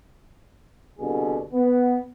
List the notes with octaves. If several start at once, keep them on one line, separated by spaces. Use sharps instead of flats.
C2 G2 B2 D3 G#4
B3